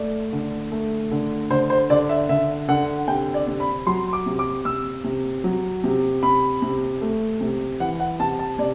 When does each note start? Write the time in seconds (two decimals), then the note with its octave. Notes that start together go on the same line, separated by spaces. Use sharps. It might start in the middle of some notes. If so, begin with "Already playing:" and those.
Already playing: A3 D5
0.33 D3
0.72 A3
1.11 D3
1.50 D3 C5
1.70 C5
1.90 D3 D5
2.09 E5
2.29 D3 E5
2.68 D3 F#5
3.08 C3 G5
3.34 D5
3.48 C3
3.60 B5
3.86 F#3 C6
4.13 D6
4.26 C3
4.39 D6
4.65 C3 E6
5.04 C3
5.44 F#3
5.84 C3
6.23 C3 B5
6.62 C3
7.01 A3
7.41 C3
7.80 E3 F#5
8.00 F#5
8.20 C3 A5
8.39 A5
8.58 C3 D5